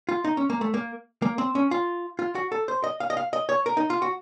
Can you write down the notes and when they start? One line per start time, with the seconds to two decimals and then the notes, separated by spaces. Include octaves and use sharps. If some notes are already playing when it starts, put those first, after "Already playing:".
0.09 F4
0.24 D#4
0.37 C#4
0.50 A#3
0.61 A3
0.74 A#3
1.22 A#3
1.38 C4
1.55 C#4
1.71 F4
2.19 F4
2.35 F#4
2.52 A4
2.68 C5
2.84 D#5
3.00 F5
3.10 D#5
3.17 F5
3.33 D#5
3.49 C#5
3.66 A#4
3.77 D#4
3.90 F4
4.02 F#4